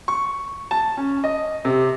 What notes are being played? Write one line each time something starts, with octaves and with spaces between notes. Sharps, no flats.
C#6
A5
C#4
D#5
C3